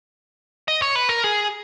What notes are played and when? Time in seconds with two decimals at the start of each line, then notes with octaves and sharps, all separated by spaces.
0.68 D#5
0.82 C#5
0.95 B4
1.09 A#4
1.24 G#4